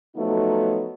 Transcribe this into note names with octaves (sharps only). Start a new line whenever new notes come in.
F3 F#3 A3 B3 D#4